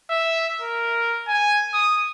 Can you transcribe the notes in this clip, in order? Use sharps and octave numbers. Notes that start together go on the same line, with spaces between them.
E5
A#4
G#5
D#6